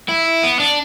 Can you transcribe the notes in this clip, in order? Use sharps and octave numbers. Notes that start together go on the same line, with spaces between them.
E4
B3
D4